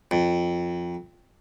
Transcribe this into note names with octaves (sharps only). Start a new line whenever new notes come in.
F2